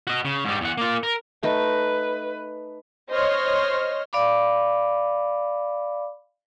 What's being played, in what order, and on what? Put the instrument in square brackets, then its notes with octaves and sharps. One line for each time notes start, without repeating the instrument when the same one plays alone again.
[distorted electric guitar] F#4 D#5
C#3
G#2 G3
E2 F#5
A#3 F4
A#4
[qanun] A3 D#4 [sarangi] B4
[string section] C5 C#5 D#5 C6 F6
[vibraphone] D5 F5 B5 D6